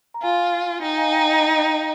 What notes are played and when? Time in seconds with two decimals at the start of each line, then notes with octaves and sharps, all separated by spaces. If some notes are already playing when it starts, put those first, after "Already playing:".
0.14 A#5
0.22 F4 F5 G#5
0.82 D#4 D#5 G5
0.97 F5 G#5
1.12 G5 A#5
1.27 D#5 G5
1.42 D#5 G5
1.52 F5
1.57 D#5 G5
1.72 D#5